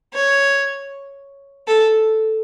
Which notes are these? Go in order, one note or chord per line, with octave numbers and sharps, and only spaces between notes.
C#5
A4